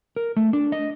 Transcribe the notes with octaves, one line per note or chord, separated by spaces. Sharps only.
A#4
A3
D4
D#5